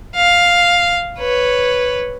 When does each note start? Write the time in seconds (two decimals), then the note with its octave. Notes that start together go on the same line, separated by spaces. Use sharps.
0.16 F5
1.19 B4 C#5